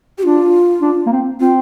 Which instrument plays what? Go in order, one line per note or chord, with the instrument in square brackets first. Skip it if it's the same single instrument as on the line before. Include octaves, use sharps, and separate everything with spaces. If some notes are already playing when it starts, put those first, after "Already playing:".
[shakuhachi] G4
[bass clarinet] D4 [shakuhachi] F4
[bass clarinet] D4
A#3
C4
[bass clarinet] C4 [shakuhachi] F4